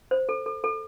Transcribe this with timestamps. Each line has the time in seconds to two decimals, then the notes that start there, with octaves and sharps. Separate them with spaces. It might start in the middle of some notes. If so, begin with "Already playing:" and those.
0.11 C5
0.29 A4
0.46 A4
0.64 A4